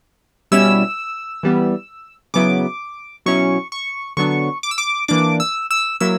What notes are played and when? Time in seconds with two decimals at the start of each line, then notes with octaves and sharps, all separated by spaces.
0.52 B2 G3 C#4 E4 E6
1.43 E3 G3 B3
2.34 C#3 F#3 B3 E4 D6
3.26 B2 F#3 C#4 E4 C#6
3.72 C#6
4.17 D3 F#3 B3 D4 C#6
4.63 D6
4.71 E6
4.78 D6
5.08 E3 A#3 D4 D6
5.40 E6
5.71 E6
6.00 F#3 A#3 E4 E6